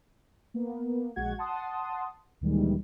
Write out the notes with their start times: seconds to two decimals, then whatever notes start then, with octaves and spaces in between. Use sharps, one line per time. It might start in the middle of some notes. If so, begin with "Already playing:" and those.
0.54 A#3 B3
1.16 A#1 G#3 F#4 F#5 G#6
1.38 F#5 A5 C6 D#6
2.41 D2 A#2 D#3 E3 G3 G#3